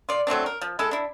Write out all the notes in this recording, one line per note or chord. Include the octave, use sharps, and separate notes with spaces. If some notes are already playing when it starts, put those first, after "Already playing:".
F4 D5
F#3 A3 C4 D4
A#4
F3
G#3 E4 A4
D4 E4